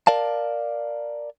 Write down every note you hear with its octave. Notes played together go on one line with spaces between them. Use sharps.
A#4 D5 F5 A5